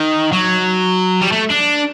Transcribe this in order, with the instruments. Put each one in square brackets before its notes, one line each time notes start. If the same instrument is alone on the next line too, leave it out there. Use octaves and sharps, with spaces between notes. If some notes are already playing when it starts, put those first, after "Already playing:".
Already playing: [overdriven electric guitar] D#3
F#3
G3
A3
D4